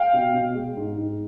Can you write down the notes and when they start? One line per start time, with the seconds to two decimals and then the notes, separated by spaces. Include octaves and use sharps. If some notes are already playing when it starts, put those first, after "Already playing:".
Already playing: F5 G5
0.13 B2
0.34 B2
0.54 G#3
0.77 G#2
0.98 G#2